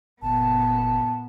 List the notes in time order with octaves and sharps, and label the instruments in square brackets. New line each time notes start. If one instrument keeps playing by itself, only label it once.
[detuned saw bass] F#1 [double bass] A#2 [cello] B3 [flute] A5